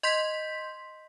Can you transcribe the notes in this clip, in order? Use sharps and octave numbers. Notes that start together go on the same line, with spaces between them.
D#5 C6 G6 B6